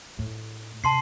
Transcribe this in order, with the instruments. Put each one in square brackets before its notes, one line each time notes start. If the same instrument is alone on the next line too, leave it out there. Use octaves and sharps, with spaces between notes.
[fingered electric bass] A2
[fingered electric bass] C3 [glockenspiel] A5 C6 C7